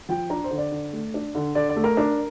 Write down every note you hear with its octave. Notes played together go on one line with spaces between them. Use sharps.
F3 G5
D4 A#5
C5
D3
D5
D3
A3
D4
D3
D3 D5
D5
A3
A#4
D4